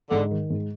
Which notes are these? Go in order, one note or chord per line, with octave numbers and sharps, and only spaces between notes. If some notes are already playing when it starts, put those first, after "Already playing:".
G#2 D3
D#3
G#2